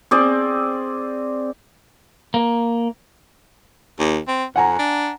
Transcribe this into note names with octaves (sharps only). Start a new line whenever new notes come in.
C4 G#4 D5
A#3
D#2
C4
F2 F#5 G#5 A#5
D4